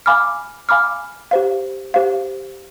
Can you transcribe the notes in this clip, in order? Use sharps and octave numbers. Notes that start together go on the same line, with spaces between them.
F5 G#5 B5 D6 F6
F5 G#5 B5 D6 F6
G4 C5 F5
G4 C5 F5